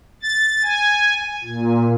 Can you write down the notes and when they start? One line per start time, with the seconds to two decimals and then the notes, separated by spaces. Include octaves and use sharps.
0.23 A6
0.64 G#5
1.44 A#2